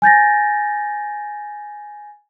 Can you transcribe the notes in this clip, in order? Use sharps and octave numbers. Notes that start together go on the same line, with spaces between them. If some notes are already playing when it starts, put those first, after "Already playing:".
G#5 G6 A6 A#6